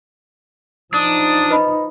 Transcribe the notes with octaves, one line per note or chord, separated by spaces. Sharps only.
F3 D4 D#4 D#6
B4 D#5 B5